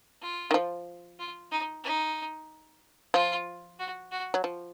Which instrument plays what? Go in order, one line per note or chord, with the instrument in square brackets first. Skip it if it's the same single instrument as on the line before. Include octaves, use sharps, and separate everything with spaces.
[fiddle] F4
[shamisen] D#3
F3
[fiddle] F4
D#4
D#4
[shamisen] F3 [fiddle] F4
[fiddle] F#4
F#4
[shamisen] F#3
F3